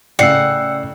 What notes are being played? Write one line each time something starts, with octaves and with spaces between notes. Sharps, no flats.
A2 C#3 D5 F#5 G5 E6 C7